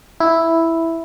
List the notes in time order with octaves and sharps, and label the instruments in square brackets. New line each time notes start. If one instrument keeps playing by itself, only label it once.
[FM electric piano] E4